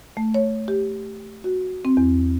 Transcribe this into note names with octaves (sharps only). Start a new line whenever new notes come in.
A3
C#5
G4
F#4
C4
E2